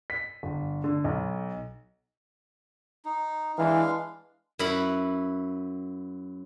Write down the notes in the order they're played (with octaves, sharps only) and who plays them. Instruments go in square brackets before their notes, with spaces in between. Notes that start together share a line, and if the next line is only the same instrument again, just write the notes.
[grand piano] B6
G1
D3
B1
[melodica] D#4
[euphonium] E3 [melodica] G#3 D4 F5
[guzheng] F#2 E4 B4 F#5 B5